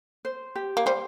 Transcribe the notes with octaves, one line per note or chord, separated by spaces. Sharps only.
C5
G4
A#3
G3 C5